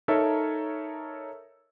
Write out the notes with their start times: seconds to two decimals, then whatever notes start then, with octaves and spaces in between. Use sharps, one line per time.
0.08 D#4 A4 A#4 C#5 E5